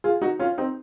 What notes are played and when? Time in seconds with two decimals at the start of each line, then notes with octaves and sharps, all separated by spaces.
0.04 F4 G#4
0.22 D#4 F#4
0.39 C#4 F4
0.58 C4 D#4